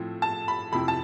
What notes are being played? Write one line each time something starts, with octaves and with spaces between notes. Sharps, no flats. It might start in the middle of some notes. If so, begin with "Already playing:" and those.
Already playing: A2 F3 C4 E4
A5
B5
F2 C3 F3 C4 E4 B5
A5